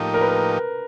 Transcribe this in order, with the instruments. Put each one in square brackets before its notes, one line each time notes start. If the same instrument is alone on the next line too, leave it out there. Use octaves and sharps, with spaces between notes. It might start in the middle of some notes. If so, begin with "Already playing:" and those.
Already playing: [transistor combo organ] A2 F3 A#3 D#4 G4 [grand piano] A#4
[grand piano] A#4
B4
A#4